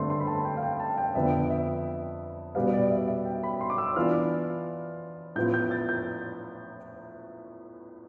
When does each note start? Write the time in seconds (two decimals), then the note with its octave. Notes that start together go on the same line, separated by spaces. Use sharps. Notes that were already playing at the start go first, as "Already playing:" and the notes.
Already playing: G2 D3 A3 C4 C6
0.10 C6
0.20 B5
0.27 A5
0.45 G5
0.57 F5
0.63 G5
0.80 A5
0.98 G5
1.15 F2 D3 F3 B3 E5
1.50 E5
2.55 B2 G3 B3 F5
2.73 D5
2.91 E5
3.08 E5
3.25 G5
3.43 B5
3.61 C6
3.70 D6
3.78 E6
3.96 E3 B3 D4 F4 F6
5.36 A2 F3 B3 F4 G6
5.54 G6
5.71 A6
5.89 G6